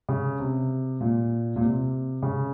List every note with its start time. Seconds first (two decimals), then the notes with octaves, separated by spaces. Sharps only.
0.09 C#3
0.40 C3
1.00 A#2
1.56 A#2
1.61 C3
2.23 C#3